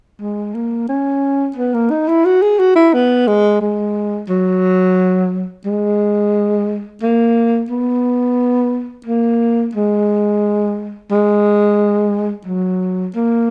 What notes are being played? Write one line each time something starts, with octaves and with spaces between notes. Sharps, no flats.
G#3
A#3
C#4
B3
A#3
D#4
E4
F#4
G#4
F#4
E4
B3
G#3
G#3
F#3
G#3
A#3
B3
A#3
G#3
G#3
F#3
A#3